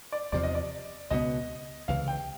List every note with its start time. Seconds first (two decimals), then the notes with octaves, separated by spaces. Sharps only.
0.12 D5
0.32 E2 C3 F3 D5
0.43 D#5
0.55 D5
1.11 C#2 B2 F#3 B3 D#5
1.88 C#2 C3 E3 F5
2.08 G5